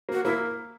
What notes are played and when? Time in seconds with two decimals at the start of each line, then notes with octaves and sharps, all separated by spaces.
0.09 A#3 F#4
0.25 A#3 E4